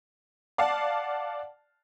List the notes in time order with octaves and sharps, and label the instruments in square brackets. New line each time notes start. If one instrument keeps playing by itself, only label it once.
[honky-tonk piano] D5 F5 F#5 A5